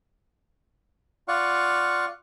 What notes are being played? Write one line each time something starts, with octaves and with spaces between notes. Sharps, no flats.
F4 D5 F5 F#5 C#6